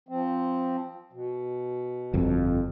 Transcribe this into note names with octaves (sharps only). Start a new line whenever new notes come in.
F3 C4
B2
G1 F2